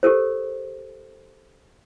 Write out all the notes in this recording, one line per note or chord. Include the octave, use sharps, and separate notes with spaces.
G4 A4 A#4 C5